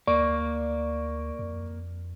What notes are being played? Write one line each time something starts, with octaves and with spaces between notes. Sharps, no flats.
D2 A#3 D5 C#6
F2